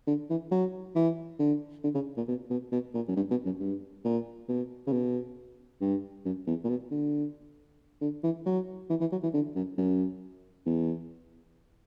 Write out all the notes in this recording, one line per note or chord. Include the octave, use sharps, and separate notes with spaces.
D3
E3
F#3
E3
D3
D3
C#3
A#2
B2
B2
B2
A#2
F#2
G2
B2
F#2
G2
A#2
B2
C#3
B2
G2
F#2
E2
A#2
B2
D3
D3
E3
F#3
E3
E3
F#3
E3
D3
F#2
F#2
E2